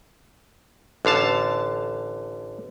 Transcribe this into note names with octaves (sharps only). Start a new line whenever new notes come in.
A1 D3 F5 A5